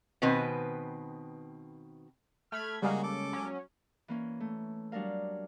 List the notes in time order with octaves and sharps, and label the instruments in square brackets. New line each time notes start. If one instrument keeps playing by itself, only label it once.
[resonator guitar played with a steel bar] B2 D#3 C4 B4 G#5
[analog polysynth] A3 B5 G#6 [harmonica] F6
[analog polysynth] C#3 [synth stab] G3 G#3 A#3 [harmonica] D#4 F#4 G#4
[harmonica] A4 D6
[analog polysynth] F#3 C#4
[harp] E3 A#3 C#4
A3
F#3 G3 D4 A#4 F5